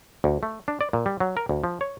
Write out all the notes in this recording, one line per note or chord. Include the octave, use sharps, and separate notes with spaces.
D2
A3
D4
D5
A#2
G3
F#3
A#4
D2
F3
C#5